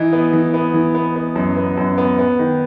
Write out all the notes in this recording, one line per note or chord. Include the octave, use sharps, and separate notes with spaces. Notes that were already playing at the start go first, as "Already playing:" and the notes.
Already playing: E3 D#4
B3
E3
B3
E3
B3
B3
F#2
B3
F#2
B3
B3
D#3